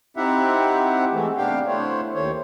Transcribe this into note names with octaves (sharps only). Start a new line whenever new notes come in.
C4 D#4 E4 G4 E5 F#5
E3 G#3 A3
C3 B3 D4 G4 F5 G5
A3 D4 E4 C5 C#5
D#2 D#3 A3 C5 C#5